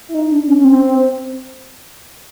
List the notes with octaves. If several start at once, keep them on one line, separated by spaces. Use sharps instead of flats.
E4
D#4
D4
C#4
C#4
C4